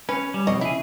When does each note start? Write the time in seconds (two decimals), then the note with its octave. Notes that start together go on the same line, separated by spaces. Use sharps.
0.09 C#4 B4
0.34 G3
0.47 F2 B2 C#5 D#5
0.61 C#3 E4 G#4